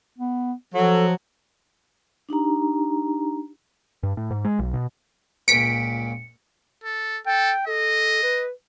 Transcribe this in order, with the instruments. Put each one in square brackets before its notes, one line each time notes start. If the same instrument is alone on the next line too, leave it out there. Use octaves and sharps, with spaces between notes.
[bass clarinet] B3
[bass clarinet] F3 [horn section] F#3 [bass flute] A4
[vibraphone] D4 D#4 G4 A#5
[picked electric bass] G2
A2
G#2
G#3
B1
B2
[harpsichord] C#2 A#2 [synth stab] B6 D7 [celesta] C#7
[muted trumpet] A4
[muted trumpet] A4 [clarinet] G5
[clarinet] A4 [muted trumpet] D#5
[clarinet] B4